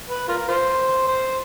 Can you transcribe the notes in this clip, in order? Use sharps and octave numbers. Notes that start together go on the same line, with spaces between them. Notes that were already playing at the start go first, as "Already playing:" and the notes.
B4
F4 A#4
F4 C5
C5